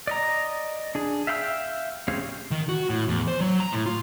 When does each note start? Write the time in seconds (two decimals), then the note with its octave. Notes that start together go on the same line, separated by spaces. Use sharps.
0.07 D5 D#5 A#5
0.95 D4 G#4
1.27 E5 F5 G5 B5 E6
2.08 C4 C#4 G4 G#4 F5
2.51 D#3
2.69 F#4
2.90 A2
3.08 E2
3.28 C5
3.40 F#3
3.60 A#5
3.73 A2
3.86 F4